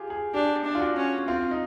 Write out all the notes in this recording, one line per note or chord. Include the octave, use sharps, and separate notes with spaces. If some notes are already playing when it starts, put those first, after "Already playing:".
Already playing: F4 G4 G#4
G#4
D4 G4
D4
F4
F#4
C#4
C4 F4
D#4